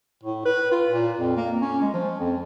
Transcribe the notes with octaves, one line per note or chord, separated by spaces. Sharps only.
A2
B4
F4
A#2
F2
A#3
C#4
G#3
F3
F2